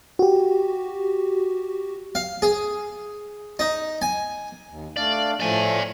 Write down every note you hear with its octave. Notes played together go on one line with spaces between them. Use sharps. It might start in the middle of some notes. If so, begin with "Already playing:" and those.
F#4 G4
F5
G#4
D#4
G#5
D#2
A3 D4 D5 F5
A2 F3 A3 D5 G#5